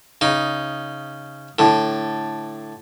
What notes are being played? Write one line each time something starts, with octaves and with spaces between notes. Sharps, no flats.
C#3 D#4
A2 D3